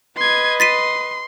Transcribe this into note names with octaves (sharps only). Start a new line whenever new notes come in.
B4 D#5 C6 G#6
C6 A6 B6 D#7